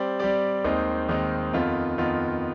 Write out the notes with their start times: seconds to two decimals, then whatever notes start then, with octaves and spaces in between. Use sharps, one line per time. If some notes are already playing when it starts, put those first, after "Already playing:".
Already playing: G3 C4 G4 D5
0.19 G3 C4 G4 D5
0.64 D#2 D#3 G#3 C4 D#4
1.09 D#2 D#3 G#3 C4 D#4
1.53 F2 D#3 B3 F4
1.98 F2 D#3 B3 F4